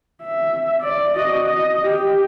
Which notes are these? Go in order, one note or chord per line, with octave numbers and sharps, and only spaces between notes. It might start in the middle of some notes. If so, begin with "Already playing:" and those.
E5
D5
F#4 D#5
D#5
G4